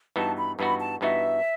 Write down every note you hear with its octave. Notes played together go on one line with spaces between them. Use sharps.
G2 E3 B3 D#4 F#4 A5
B5
G2 E3 B3 D#4 F#4 B5
A5
G2 E3 B3 D#4 F#4 E5